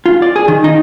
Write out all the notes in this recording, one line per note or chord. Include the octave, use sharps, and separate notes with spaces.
F4
D5
G#4
D#3
D#4